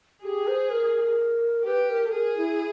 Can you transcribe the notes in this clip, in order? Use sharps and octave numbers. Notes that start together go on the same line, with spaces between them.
G4 G#4
C5
A#4
G4 B4
A#4
A4
G#4 A#4
E4